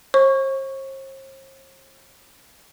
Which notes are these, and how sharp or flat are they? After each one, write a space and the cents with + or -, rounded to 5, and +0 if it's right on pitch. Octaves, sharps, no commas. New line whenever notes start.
C5 +45 C#6 +0